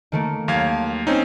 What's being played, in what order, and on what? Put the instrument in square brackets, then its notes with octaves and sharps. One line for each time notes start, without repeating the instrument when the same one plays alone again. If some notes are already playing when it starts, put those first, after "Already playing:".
[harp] D#3 A3 A#3
[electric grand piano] D#2 F5 G#6 [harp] F#3
[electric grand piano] C4 C#4 D#4